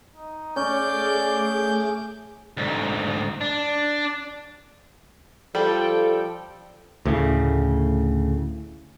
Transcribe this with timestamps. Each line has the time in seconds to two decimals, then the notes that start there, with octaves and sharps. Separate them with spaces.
0.16 D#4
0.56 A3 C#4 G#4 D5 D6 G6
2.57 D2 G#2
3.41 D4
5.55 F3 G3 A4 G5
7.05 D2 A2 C#3